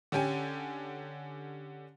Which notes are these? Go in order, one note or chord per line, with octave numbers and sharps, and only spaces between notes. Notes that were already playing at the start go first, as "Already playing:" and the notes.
D3 C#4 G4 G5 G#5